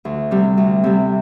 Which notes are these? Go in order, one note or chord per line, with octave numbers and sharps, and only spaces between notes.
D2
C3 G3
D2
C3 G3